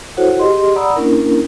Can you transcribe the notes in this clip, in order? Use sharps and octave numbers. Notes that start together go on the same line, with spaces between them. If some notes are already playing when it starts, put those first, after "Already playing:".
E4 F#4 A4 C5 C#5 F#5
G4 G#4 D#5 C6
D5 F#5 A#5 B5 D#6 E6
A#3 C#4 D4 E4 A#4